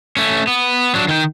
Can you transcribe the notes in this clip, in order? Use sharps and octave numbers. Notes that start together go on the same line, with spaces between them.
A3 C#4
B3
F#3 D4
D#3 G5